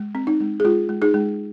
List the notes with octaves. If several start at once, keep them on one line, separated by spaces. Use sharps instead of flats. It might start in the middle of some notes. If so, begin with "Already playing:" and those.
Already playing: G#3
C4
D#4
G#3
G#4
G#3 F4
G#3
D#4 G#4
G#3